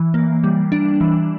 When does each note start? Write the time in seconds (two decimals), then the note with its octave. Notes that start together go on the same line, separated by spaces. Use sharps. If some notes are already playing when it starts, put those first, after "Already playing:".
Already playing: E3
0.14 A#3
0.44 G3
0.72 D4
1.01 E3